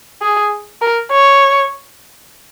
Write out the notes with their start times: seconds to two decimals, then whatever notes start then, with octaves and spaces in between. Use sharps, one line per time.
0.22 G#4
0.82 A#4
1.12 C#5